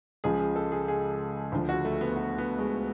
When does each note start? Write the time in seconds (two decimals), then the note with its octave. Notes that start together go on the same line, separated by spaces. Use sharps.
0.24 C#2 C#3 F3 G#4
0.40 G#4
0.56 A4
0.72 G#4
0.88 G#4
1.52 D2 D3 F3
1.69 F#4
1.85 A3
2.01 B3
2.16 B3
2.38 B3
2.59 G#3